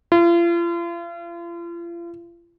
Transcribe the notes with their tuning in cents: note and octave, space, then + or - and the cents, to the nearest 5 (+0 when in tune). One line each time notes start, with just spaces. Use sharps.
F4 -40